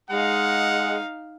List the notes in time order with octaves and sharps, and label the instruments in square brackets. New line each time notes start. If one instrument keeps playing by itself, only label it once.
[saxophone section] G#3 [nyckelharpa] D#4 F5 [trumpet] F#5